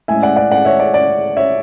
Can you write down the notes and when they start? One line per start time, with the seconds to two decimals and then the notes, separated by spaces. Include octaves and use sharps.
0.08 A2 G#3 C#4 E5 G#5
0.23 D5 F#5
0.36 D5 F#5
0.51 D5 F#5
0.65 C#5 E5
0.79 D5
0.94 D5
1.37 C#5 E5